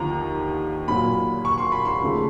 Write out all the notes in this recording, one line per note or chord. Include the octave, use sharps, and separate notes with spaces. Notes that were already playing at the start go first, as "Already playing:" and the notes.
Already playing: D#2 D3 F3 A#5
A#2 F#3 A#3 B5
C#6
C6
B5
C6
D#2 C#3 F3 A3